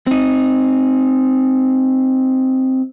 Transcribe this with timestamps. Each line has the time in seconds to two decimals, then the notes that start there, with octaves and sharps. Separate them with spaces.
0.07 C4 D#4